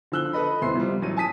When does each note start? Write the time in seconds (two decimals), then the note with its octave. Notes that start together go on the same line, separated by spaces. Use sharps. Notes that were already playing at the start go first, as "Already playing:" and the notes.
0.12 D3 F3 E6 F#6 G7
0.33 A4 B4 D#5 B5
0.61 D#1 A2 C3 E5 C6 C7
0.75 C3 F3 G3
1.02 A1 F#3 D#7
1.17 G#5 A5 D#6 B6 D#7